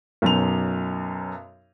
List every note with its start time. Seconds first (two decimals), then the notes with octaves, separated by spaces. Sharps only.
0.22 B1 F#2 F7